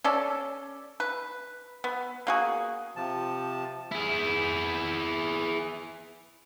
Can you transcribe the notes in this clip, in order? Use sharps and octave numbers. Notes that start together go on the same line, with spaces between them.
C#4 A4 D5
B4
B3
A#3 F#4 G#4
C3 F3 A5
E4 G#4